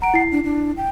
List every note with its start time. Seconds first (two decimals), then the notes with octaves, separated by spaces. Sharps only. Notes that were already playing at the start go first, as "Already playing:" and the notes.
0.02 F#5 A#5 D7
0.14 E4 C7
0.32 D4
0.44 D4
0.77 G5